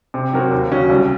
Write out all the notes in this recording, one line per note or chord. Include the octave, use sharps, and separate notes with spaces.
C3
F#3 C4 F#4 A#4
D#2
C#3 F#3 C#4 F#4
C2